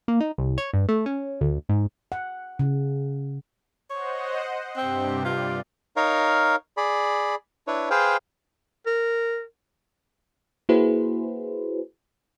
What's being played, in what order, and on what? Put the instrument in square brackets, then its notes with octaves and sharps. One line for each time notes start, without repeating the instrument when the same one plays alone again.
[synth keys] A#3
D#4
C2
C#5
G2
A3
C#4
D2
G#2
[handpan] F#5
C#3
[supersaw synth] C5 D#5 F#5 [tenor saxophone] C#5
[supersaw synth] G2 C3 G4 [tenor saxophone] C4
[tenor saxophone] F4 [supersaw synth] D5
[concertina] D#4 A#4 C#5 F5
G#4 D5 B5
D4 E4 B4 C#5
G#4 B4 C5 F5 G5
[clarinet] A#4
[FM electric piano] A#3 E4 F#4 G#4 B4 C5